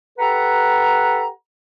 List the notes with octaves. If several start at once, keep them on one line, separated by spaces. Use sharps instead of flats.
G4 A4 B4 F#5 A#5